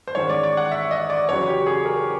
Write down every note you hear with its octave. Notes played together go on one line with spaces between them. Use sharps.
C5
A1 G#2 D#3 G#3 C#5
D5
D5
F#5
E5
D#5
D5
E2 C#3 F#3 C#5
G4
G#4
A#4